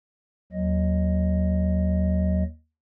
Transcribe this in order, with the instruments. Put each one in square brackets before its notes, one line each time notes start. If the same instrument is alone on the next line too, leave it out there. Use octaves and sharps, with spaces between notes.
[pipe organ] D#2 F#3 D#5